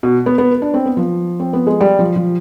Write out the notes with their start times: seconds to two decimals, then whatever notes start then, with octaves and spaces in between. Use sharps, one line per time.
0.03 B2
0.26 B3
0.38 B3
0.62 D4
0.74 C4
0.86 B3
0.97 F3
1.40 C4
1.53 B3
1.67 G#3
1.81 G3
1.99 F3
2.16 F3